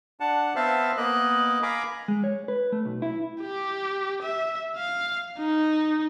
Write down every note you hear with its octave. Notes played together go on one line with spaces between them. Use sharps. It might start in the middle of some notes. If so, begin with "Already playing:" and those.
D4 F#5 A5
B3 C4 C5 E5 F5 A5
A#3 B3 D#5 F#6
F5 G#5 A#5 B5 D6
G#3
C#5
B4
A3
B1
E4
G4
E5
F5
D#4